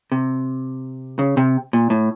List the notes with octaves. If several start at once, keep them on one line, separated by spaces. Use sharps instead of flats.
C3
C#3
C3
A#2
A2